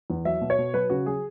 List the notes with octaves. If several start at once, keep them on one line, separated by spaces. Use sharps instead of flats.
E2
F#3 E5
B2
C#5
B2
F#3 B4
C#3 F#4
F#3 G#4